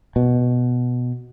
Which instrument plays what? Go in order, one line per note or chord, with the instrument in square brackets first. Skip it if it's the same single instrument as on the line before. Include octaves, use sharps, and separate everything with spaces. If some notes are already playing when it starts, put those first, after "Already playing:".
[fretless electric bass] B2